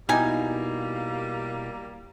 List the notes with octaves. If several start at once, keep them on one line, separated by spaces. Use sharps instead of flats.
B2 G3 A#3 D#4 E4 G4 D#5 G#5